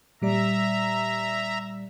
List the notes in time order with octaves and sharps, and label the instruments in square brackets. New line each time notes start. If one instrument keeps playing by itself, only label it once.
[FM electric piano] A#2 G3 D5 [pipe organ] E5 A#5